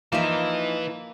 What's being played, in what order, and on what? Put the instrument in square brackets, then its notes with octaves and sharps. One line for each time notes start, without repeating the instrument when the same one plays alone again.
[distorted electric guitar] E3 [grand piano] F3 D#4 [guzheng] A#3 E5